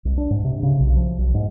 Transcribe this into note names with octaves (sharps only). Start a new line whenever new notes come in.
C2
D4
G#2
C3
C#3
B1
F3
B1
G#2